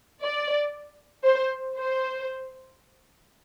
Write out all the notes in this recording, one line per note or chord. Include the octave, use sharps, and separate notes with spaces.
D5
C5
C5